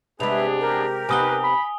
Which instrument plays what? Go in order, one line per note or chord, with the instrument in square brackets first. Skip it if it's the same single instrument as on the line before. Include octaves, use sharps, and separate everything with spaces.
[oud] C3 G#3 [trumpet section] B3 D4 G#4 [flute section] B4 E5 [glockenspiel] F7
[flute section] G4 A#4
[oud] C3 B3 D#4 [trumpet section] B4 [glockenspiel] G#5 D#6 G7
[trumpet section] B5